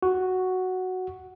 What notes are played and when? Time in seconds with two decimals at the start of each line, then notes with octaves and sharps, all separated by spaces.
0.03 F#4